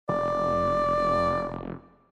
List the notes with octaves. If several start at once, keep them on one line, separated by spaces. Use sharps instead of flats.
F1 D5